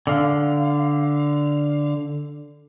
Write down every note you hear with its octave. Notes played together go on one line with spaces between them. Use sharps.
D3 F5